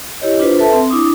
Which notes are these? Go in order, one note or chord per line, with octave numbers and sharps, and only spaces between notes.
E4 G4 C#5 D#5
D4 F4 B4 C5
A4 B4 E5 A5
C4
D4 E4 D6 D#6